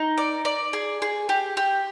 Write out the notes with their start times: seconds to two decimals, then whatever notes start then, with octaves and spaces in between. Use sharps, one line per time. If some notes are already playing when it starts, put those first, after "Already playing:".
Already playing: D#4
0.17 D5
0.45 D5
0.73 G#4
1.02 G#4
1.29 G4
1.57 G4